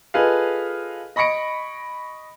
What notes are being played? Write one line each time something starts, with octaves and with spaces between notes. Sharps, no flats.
F4 G#4 A4 B4 D#5 F5
D#5 B5 C#6 A#6 C#7 D7